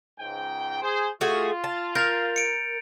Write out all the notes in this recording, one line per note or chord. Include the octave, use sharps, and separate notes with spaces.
C#2 G#2 G5
G#4 C5
A3 F4 F#4 G#4
A5
A#4 G6 A6 F7
C#7 D7